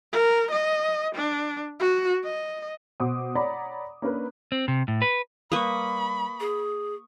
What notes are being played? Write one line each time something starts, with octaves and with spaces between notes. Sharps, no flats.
A#4
D#5
D4
F#4
D#5
B2 C5 F#5 D6 D#6
C#5 D5 F#5 A#5 B5
A#3 C#4 D4 A#4 B4
C4
C3
A2
B4
G3 A#3 B4 B5 C#6 D#6
G#4